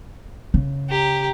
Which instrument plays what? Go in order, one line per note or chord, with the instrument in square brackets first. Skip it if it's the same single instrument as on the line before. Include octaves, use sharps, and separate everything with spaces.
[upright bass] C#3
[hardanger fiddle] G4 A#5